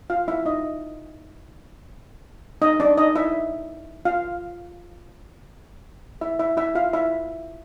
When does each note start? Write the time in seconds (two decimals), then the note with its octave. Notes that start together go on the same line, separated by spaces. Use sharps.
0.10 F4 F5
0.28 E4 E5
0.45 D#4 D#5
2.62 D#4 D#5
2.80 D4 D5
2.98 D#4 D#5
3.15 E4 E5
4.05 F4 F5
6.21 E4 E5
6.39 E4 E5
6.57 E4 E5
6.75 F4 F5
6.93 E4 E5